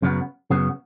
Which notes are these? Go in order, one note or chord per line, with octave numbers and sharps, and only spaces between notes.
F#2 C#3 F#3 B3
F#2 C#3 F#3 B3